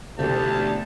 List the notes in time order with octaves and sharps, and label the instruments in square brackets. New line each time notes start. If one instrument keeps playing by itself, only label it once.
[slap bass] A1 B2 D4 [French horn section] D2 [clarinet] G4 [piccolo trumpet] A5